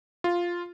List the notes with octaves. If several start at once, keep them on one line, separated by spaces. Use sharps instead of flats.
F4